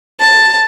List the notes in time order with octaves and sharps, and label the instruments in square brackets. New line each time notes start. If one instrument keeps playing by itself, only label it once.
[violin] A5